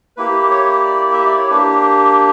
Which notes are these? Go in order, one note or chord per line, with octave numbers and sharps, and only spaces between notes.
A#3 E4 G4 B4
C#5
D5
E5
D5
C#5
A#3 D4 G4 B4